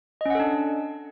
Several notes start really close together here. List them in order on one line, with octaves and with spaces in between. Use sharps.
D#5 C#4 F#5 A4 D4